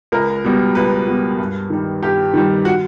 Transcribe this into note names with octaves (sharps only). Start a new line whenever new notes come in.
C#2 A#4
B2 G3
C#2 B4
B2 G3
G2
D#3 G3
G2 G4
D#3 G3
F#4